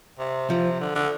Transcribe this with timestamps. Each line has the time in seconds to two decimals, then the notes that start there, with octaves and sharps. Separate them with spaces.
0.19 C3
0.49 C3 F3
0.80 D3
0.95 D3